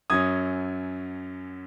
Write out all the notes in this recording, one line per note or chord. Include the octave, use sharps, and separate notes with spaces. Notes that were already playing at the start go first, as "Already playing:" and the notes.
F#2 F#3 C#4 D#6 G#6